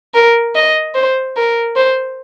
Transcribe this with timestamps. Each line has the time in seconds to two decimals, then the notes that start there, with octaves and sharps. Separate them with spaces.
0.14 A#4
0.55 D#5
0.95 C5
1.36 A#4
1.76 C5